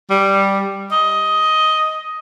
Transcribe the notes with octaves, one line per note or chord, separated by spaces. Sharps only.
G3
D#5